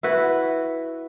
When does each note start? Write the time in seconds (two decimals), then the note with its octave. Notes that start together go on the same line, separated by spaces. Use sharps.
0.03 E4 F#4 B4